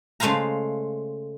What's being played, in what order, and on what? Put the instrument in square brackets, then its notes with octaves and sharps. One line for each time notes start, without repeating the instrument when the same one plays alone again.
[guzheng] C#3 G#3 A3 C5 F5 A#5